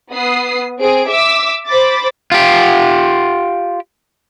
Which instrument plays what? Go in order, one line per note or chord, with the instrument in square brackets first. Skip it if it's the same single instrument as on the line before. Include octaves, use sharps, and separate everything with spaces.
[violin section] B3 D#6 C7
C4 G#4 D7
E5 D6 E6
C5 B5 D6 A6
[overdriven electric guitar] F4 G4